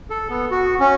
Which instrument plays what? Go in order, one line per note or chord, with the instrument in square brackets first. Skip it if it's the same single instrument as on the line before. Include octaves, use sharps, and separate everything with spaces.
[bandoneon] A4
B3
F#4
C#4